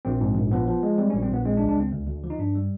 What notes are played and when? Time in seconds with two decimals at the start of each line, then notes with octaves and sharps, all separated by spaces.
0.05 A#1 C4
0.21 G#2
0.36 A#1
0.52 F3 B3
0.67 F3
0.83 G#3
0.98 G3 C4
1.10 C#4
1.14 A#1
1.23 C4
1.30 A#1 B3
1.45 G#3 C4
1.57 D4
1.61 C#2
1.69 D4
1.77 C#2 C4
1.92 D2
2.07 D2
2.24 F3
2.30 D#4
2.39 G2 D4
2.55 G3